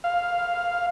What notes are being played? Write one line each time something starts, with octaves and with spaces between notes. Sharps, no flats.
F5